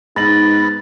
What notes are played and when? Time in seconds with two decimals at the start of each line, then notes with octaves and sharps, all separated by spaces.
0.16 G#2 B3 D#4 A6 A#6 F#7